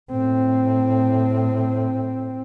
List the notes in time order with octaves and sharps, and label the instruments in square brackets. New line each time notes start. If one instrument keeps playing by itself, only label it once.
[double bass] A2 C4